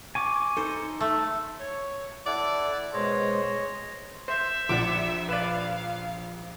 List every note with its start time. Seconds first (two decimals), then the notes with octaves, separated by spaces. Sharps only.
0.15 G#5 C#6 D6
0.57 D#4 A4 C5
1.00 A3
1.60 C#5 C#6
2.26 E4 A4 D5 F#5
2.94 B2 G#3 C5 C#5 D#5
4.28 C5 E5
4.69 A#1 D5 F#5 D6
5.29 B4 D5 F5